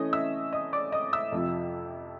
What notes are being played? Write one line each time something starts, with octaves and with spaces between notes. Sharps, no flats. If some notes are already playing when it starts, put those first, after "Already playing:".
Already playing: E3 A3 C#4 D#5
E5 E6
D#5 D#6
D5 D6
D#5 D#6
E5 E6
F2 C3 F3